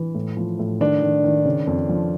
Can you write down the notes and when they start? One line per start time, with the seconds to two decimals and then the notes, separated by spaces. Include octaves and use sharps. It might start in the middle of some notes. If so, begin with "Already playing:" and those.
Already playing: E3
0.15 A2
0.37 F3
0.59 A2
0.80 D#3 D4
1.02 D#3
1.24 D#3
1.45 C#3
1.67 F2
1.89 F3